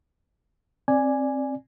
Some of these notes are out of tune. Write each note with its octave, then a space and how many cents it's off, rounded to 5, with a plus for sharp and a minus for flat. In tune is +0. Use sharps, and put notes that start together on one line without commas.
C4 +20 D5 +0 G#5 +0